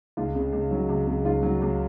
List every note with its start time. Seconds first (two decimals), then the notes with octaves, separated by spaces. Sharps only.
0.17 C#2 F4
0.35 C#3
0.53 C#2
0.71 F#3
0.89 C#2
1.07 C#3
1.25 C#2 F4
1.43 F#3
1.62 C#2